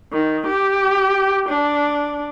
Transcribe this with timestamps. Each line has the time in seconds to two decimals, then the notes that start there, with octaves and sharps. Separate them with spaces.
0.12 D#3
0.47 G4
1.49 D4